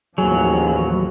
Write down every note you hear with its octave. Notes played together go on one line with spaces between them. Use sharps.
A1 D#2 F3 F#3 G#4